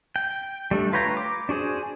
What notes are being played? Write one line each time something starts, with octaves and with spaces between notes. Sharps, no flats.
G5
G3 A3 D4
F4 B4 C#5 G5 A#5
D6
D4 F#4 G#4 C5